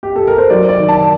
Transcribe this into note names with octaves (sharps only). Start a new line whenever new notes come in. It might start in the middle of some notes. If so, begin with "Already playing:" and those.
G4
A4
A#4
C5
F#3 D5
D5
D#3
A5